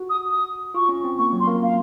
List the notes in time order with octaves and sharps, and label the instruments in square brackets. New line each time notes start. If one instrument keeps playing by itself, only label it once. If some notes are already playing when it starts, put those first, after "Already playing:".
Already playing: [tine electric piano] F#4
[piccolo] D#6
D#6
[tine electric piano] F4 [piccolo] C#6
[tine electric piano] C#4
C4
[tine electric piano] A#3 [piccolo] C#6
[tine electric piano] F#3
[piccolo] C6
[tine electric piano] A#3
[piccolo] F5